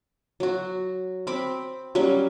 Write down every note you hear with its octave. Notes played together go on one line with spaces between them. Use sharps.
F#3 F#4
C4 B5 D6
F#3 G3 A#3 C#4